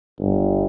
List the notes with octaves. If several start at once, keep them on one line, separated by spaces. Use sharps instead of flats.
G1